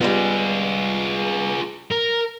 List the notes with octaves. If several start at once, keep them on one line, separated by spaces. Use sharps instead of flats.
G3 G#3 B3 F4 G#4
A#4